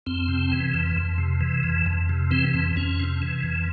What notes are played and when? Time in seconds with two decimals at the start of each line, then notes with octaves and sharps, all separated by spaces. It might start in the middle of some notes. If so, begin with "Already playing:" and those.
0.06 F2 C4
0.28 C3
0.52 E3
0.74 F2
0.96 F2
1.18 C3
1.41 E3
1.63 F2
1.86 F2
2.09 C3
2.31 E3 C4
2.54 F2
2.76 F2 C#4
2.99 C3
3.22 E3
3.43 F2